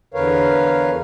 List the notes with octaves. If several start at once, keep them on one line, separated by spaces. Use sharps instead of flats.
E2 D3 A#4 B4 C#5 F5